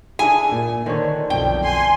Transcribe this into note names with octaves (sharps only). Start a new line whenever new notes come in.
D4 E4 G#4 G#5
A#2
D3 D#3 D4 C5 C#5
B1 F2 G5
G#5 C6